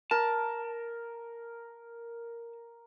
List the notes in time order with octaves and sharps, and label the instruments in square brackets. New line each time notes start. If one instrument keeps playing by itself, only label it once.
[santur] A#4 [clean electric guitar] A5